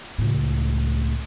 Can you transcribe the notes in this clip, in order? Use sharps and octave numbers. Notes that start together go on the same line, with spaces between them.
C#2 A2